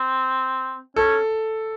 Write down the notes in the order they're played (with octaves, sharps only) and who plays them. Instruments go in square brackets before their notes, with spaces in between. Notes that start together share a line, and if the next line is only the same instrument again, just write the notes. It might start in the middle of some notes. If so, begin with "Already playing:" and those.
Already playing: [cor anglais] C4
[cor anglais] C#4 [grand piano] A4